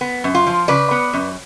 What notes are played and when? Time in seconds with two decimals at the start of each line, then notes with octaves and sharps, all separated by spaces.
0.01 B3
0.24 F#2
0.35 F4
0.47 F3
0.68 C#3 B4 D5
0.91 B3
1.13 F#2